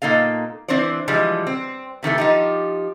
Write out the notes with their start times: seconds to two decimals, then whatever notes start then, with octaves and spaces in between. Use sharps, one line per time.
0.02 A#2 A#3 D#4 A4 F5
0.68 E3 C4 D4 C5 D5
1.08 E3 F3 G3 G#3
1.47 C4
2.03 C3 D#3 E3 A3
2.18 F3 D#4 G4